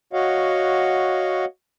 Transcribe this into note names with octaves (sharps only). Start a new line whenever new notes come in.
F#4 C#5 D#5 F5 F#5